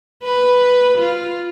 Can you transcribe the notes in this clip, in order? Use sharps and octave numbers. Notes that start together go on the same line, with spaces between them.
B4
F4